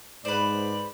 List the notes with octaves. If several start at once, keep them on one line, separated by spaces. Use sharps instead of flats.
G#2 B4 C5 D5